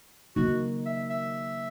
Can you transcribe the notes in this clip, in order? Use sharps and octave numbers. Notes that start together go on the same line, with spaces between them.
C#3 F#3 A#3 D#4 F#4
E5
E5